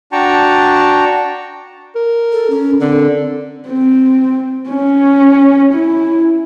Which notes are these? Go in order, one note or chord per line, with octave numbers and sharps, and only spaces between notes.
D4 F#4 G5 A5 A#5 C#6
A#4
A4
C#4
D3 C4
C4
C#4
E4